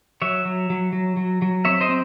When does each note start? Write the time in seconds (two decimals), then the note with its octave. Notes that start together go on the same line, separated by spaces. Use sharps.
0.22 F#3 C#5 E5
0.45 F#3
0.70 F#3
0.93 F#3
1.17 F#3
1.42 F#3
1.65 C4 C#5 E5
1.81 C5 D#5
1.89 C4